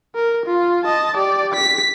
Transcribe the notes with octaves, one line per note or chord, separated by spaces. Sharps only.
A#4
F4
D#5 A5
G4 D5
B6